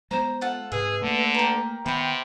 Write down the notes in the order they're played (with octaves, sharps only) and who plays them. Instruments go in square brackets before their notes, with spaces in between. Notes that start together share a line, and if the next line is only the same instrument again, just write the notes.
[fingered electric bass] G#3 A#3 B3 [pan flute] C5 [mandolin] A#5
[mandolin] F4 A4 F#5
[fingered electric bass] G#2 C3 [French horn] G#4 [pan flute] B4 [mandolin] E5
[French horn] D3 [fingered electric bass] A3 A#3
[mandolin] G4 A#4
[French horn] C3 [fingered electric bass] D#3 B3 [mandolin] F#5 G5 [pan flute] B5